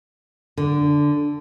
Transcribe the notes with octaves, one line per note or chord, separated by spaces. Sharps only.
D3